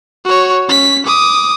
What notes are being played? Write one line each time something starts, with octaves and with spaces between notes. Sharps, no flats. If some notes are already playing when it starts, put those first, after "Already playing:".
F#4 C#5
C#4 B6
D6 D#6